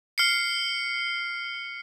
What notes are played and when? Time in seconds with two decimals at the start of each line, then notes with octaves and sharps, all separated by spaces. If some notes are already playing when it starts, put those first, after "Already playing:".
0.18 F6 C7 C#7